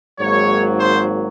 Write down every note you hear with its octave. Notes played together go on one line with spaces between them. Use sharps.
G#1 G#2 F#3 A#3 C#5
C5